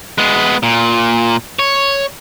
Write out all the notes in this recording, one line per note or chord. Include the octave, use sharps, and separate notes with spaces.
G#3 B3
A#2
C#5